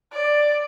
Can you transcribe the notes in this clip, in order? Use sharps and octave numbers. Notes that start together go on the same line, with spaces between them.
D5